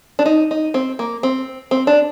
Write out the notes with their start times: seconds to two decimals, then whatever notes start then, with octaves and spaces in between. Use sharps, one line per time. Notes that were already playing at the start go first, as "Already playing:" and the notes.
0.19 D4
0.26 D#4
0.51 D#4
0.74 C4
0.99 A#3
1.23 C4
1.71 C4
1.87 D4